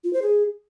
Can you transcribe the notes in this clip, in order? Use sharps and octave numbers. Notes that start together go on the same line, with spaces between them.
F4
C5
G#4